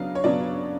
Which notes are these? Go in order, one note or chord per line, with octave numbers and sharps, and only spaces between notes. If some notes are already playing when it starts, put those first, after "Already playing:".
Already playing: C#3 F#3 B3 D4 F5
C#5
C#3 F#3 B3 D4 D5